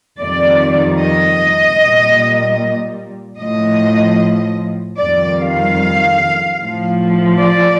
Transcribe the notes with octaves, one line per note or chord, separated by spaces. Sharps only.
F2 D#3 G3 D5
D#5
A#2 G3
A2 F3 D#5
F2 D#3 G3 D5
F5
A2 F3
D5